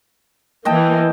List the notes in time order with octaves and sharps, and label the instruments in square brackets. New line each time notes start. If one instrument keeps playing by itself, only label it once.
[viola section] E3 A#3 [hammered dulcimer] D#5 G5 A5